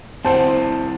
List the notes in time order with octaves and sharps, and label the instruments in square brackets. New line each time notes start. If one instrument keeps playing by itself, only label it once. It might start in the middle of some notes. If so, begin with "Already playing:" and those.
[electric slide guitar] C4 E4 F#5 [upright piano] C5 A5